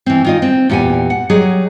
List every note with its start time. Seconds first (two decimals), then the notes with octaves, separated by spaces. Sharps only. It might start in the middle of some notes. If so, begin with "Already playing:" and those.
0.06 E3 C4
0.25 D#3 F4 D#5
0.42 C4
0.69 E2 A#2 G4 F#5 G#5
1.10 F#5
1.30 F#3 G3 G#4 D#5